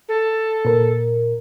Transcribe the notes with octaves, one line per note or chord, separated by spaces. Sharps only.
A4
A#2 A#4